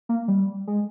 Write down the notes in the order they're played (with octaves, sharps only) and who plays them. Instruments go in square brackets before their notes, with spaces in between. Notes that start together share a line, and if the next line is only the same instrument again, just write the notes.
[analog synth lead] A#3
G3
G#3